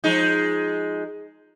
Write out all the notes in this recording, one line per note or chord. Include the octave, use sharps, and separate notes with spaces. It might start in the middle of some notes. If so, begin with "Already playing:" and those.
F3 G#3 D#4